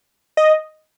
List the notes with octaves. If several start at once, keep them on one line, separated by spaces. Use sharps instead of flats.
D#5